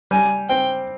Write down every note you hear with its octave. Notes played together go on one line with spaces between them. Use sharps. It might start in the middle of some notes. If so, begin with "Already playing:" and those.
G3 G#5
C4 G5